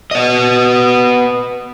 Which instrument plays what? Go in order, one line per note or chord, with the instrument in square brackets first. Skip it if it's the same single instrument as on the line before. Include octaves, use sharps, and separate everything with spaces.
[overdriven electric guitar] B3 D#5